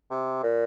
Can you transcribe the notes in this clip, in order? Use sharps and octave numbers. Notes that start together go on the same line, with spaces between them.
C3
A#2